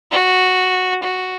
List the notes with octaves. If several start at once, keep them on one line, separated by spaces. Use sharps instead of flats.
F#4
F#4